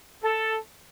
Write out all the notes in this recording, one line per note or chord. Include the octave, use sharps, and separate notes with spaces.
A4